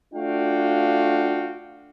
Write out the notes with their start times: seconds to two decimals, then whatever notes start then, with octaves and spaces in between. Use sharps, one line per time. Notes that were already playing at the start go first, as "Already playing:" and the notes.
0.14 A3 D4 F4 F#4 F5 G5